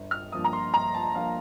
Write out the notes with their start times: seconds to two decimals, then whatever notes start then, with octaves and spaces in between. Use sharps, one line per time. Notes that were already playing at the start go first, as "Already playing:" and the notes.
Already playing: G1
0.11 F6
0.32 G2 F3 A#3 D#6
0.44 A#5
0.53 C6
0.73 G1 A#5
0.94 A5
1.15 G2 F3 A#3 F5